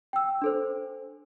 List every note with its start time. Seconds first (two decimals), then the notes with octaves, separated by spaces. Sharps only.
0.13 G5 E6
0.42 D4 A4 C5